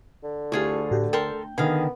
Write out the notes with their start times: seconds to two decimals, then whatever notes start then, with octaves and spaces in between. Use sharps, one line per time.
0.24 D3
0.52 D2 E4 F4 G4 G#4 C#6
0.91 A2 F#4 G4
1.13 A4 A#4 G5 C6
1.58 D3 D#3 B3 G#4 F5